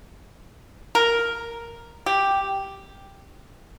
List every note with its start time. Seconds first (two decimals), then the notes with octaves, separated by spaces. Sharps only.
0.95 A#4
2.06 G4